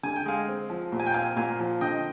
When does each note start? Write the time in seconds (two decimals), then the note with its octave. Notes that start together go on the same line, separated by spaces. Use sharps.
0.03 D3 G#5
0.16 G5
0.26 G#3 F5 G#5
0.48 C4
0.70 F3
0.92 A#2
0.99 G#5
1.06 G5
1.14 C4 F5 G#5
1.37 A#2 F5 G#5
1.59 F3
1.81 D3 D#5 G5